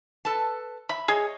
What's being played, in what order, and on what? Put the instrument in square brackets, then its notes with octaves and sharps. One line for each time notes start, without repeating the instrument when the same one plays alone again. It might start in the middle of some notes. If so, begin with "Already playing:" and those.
[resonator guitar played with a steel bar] A4 B4 A5
[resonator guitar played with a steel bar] E5 [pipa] B5
[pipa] G#4 [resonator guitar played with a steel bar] C#5 D#5